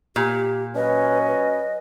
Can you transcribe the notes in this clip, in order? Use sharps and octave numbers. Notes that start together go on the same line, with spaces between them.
A#2 G4
F#3 C#4 B4 D#5
B4